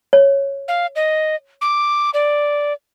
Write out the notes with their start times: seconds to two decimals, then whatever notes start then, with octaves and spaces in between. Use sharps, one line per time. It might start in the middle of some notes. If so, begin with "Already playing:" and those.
0.13 C#5
0.68 F5
0.96 D#5
1.61 D6
2.14 D5